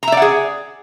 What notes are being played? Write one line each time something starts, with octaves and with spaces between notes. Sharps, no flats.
G#4 D5 E5 F#5 A#5